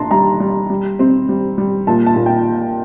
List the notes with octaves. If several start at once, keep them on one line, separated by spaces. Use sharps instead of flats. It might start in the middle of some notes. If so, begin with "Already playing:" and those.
Already playing: A#3 D4 A5 A#5 C6
G3 A#5
G3
G3
C4
G3
G3
A#2 A5
A5
A#2
G5